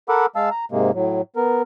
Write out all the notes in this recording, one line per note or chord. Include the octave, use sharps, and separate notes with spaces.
A4 A#4 F#5 B5 D6 E6
G#3 F5 A5 E6
A#5
G#2 C3 G#3 A#3
A2 F#3
B3 A#4